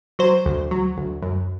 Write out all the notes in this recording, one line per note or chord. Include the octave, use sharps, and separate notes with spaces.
F#3 C5
D2
F#3
D2
F#2